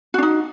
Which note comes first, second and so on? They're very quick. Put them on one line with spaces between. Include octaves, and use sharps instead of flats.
F#4 D4 D#4